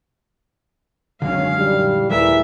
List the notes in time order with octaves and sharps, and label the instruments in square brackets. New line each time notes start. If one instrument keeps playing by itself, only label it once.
[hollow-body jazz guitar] F#2 D3 [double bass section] D#3 G#3 C#4 [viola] F5
[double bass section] A#2 E3 [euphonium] G3
[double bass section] D#2 [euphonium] E3 [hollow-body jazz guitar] G#3 A4 A#4 [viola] E5